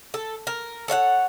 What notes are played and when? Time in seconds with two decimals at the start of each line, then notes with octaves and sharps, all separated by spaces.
0.14 A4
0.47 A#4
0.88 A4 C#5 F5 F#5